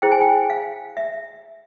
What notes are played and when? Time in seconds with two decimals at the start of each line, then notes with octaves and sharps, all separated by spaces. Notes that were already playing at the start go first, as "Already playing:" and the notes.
0.02 E4 G#4 C5 G5
0.11 G#5
0.21 G5
0.50 F5
0.97 E5